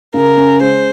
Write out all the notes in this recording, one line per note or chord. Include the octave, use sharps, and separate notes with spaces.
C#3 A#4
C#4
G#3 C5